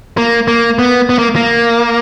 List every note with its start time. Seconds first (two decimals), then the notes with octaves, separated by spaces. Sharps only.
0.17 A#3
0.48 A#3
0.79 B3
1.09 B3
1.19 A#3
1.36 A#3